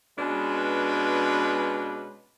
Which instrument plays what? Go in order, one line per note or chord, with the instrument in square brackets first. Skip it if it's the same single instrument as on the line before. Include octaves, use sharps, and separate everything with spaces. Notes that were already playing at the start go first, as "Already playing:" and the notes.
[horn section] B2 G#3 C#4 D4 B4